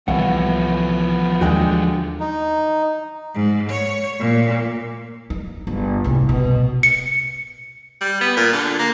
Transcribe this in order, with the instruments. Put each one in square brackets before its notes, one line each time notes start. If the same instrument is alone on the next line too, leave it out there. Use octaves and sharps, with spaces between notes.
[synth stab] C2 [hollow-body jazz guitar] A2 F#5 [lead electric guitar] E3 F3 [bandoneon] B3
[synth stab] D#2 G5 [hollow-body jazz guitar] D3 G#3 F#4
[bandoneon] D#4
[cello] G#2
C#5
A#2
[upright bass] D#4
G1
C2 A2
B2
[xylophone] C#7
[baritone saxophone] G3
B3
A#2
D3
A#3